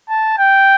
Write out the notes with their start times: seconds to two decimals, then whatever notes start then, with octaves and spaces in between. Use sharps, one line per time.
0.09 A5
0.38 G5